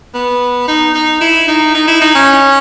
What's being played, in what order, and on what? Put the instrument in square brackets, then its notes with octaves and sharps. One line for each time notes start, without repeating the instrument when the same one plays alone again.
[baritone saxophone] B3
D#4
D#4
E4
D#4
D#4
E4
D#4
C#4